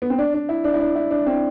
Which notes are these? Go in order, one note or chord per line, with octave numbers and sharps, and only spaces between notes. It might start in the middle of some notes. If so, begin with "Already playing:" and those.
B3
C4
D4
D4
E4
D4
E4
D4
E4
D4
C4